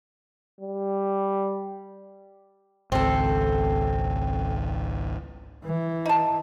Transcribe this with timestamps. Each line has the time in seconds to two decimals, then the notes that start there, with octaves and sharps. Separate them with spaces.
0.61 G3
2.92 G#1 C#2 C4 A4
5.64 E3
6.06 D#4 A5